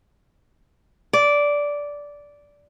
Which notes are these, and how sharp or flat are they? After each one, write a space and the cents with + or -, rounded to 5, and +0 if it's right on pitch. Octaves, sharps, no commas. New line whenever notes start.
D5 -10